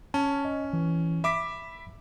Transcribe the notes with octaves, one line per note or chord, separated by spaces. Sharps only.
C#4 A5
D#5
E3
E5 B5 D6 B6